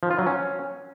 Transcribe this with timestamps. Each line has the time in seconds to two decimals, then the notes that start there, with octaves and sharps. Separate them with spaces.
0.03 F3
0.11 F4
0.19 F#3
0.27 C#4